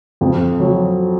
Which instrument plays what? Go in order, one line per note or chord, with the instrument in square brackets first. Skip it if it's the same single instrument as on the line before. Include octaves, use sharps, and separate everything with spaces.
[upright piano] F2
F#3